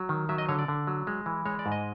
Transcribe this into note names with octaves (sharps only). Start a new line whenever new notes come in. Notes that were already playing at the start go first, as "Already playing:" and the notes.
Already playing: F#3
D#3
F#3 E5
D#5
D3 C#5
D5
D3
F#3
G#3
E3
G#3 C#5
D5
G#2
D#5